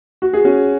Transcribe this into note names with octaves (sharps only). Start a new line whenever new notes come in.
F#4
G#4
C#4 F#4